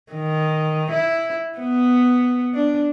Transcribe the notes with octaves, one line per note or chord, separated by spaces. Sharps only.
D#3
E4
B3
D4